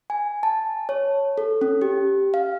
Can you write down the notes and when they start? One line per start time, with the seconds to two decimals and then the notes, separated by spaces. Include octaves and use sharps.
0.10 G#5
0.43 A5
0.89 C#5
1.38 A4
1.61 C#4
1.82 G4
2.34 F5